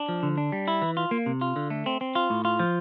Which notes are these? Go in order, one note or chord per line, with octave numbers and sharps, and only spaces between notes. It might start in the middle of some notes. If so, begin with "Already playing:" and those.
Already playing: D4
F3
D3
D4
G3
E4
E3
F4
A#3
C3
F4
D3
A3
C4
C4
F4
A2
F4
F3